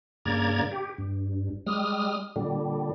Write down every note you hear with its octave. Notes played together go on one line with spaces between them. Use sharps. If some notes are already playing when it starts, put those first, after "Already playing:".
G2 C#3 A#3 D5 A#5 G#6
G4
G2
G3 G#3 D#6 F6
A#2 D3 G3